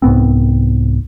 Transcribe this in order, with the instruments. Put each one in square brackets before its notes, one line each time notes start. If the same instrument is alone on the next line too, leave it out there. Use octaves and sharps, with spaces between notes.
[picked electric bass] C2 G#2 B3 C4